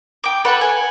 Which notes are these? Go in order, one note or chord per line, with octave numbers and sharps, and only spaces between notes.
G5 D6
A4 B4 C#5 F#5
G#5